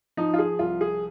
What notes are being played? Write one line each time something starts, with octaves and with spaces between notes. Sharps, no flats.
F3 D#4
F4
G#4
C2 F4
G#4